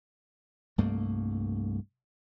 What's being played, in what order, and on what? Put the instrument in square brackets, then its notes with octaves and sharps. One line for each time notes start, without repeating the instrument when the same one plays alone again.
[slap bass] C2 G2 A3 A#3